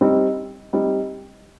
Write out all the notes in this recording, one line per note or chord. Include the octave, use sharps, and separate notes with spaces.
G3 C4 D#4
G3 C4 D#4